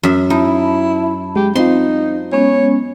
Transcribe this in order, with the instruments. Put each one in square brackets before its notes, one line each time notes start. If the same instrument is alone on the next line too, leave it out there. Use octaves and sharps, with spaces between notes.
[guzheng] F#2 E5
[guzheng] D#4 [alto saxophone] E4 [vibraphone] A5 B5
[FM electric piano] G#3 [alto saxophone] G4
[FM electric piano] C4 F4 [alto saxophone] D#4 [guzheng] C6
[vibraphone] G#3 B3 C#4 [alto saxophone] C#5